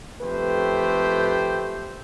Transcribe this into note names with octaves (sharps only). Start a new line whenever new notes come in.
F2 A3 G4 B4 C5 G5